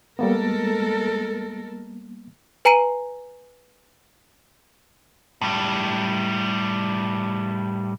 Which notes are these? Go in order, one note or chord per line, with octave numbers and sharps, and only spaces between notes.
G3 G#3 A#3 B3 A4 A#4
B4 G#5 A#5 C7 D#7
A2 G3